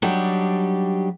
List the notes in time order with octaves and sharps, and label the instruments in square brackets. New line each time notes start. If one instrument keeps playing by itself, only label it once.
[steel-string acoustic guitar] F#3 G3 D4 D#4 G4